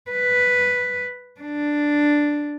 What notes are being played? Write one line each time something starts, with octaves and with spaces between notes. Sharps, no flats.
B4
D4